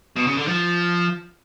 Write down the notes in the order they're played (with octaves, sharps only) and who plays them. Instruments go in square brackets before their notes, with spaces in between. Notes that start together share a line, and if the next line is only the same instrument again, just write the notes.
[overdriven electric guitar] B2
C#3
D3
F3